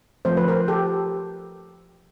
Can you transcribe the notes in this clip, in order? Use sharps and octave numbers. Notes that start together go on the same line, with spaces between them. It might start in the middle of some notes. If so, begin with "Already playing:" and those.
F3 A3 C4 C5
B4
A#4 C5
G4 A4